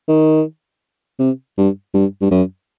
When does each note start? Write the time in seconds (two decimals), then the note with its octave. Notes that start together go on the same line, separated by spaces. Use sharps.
0.09 D#3
1.19 C3
1.58 G2
1.94 G2
2.21 G2
2.31 F#2